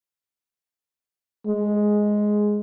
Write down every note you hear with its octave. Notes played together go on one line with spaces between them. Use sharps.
G#3